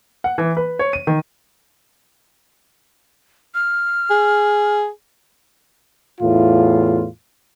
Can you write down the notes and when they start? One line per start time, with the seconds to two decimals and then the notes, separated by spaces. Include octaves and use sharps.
0.24 F#5
0.38 E3
0.57 B4
0.79 C#5
0.93 D#7
1.07 D#3
3.54 F6
4.10 G#4
6.20 E2 A2 F4